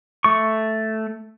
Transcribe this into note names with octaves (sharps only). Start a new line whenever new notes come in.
A3 C#6